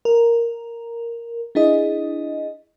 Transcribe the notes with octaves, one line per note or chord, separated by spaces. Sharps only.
A#4
D4 E4 G#4 D#5